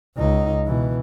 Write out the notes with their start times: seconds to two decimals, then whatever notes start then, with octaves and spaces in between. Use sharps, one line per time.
0.17 C#2 D#4
0.65 B2 E3